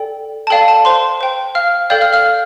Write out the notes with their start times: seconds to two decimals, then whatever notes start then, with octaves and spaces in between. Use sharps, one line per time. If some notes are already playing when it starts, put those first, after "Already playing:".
Already playing: A4 D5 G5
0.47 A5
0.50 A4 D5 F5 G5
0.68 A5
0.85 C5 C6
1.21 C5 G5
1.55 F5 F6
1.90 A4 D5 F5 G5 G6
2.01 F5 F6
2.13 F5 F6